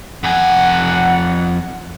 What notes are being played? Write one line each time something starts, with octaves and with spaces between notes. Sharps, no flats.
F2 F#5 G#5